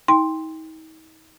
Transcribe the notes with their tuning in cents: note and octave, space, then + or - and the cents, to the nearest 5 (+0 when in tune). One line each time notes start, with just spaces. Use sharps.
D#4 +40 G5 +20 C6 +0